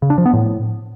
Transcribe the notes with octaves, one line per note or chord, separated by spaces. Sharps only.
C#3
D4
F3
B3
A2